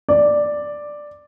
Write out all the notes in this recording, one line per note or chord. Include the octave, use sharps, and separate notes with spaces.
D5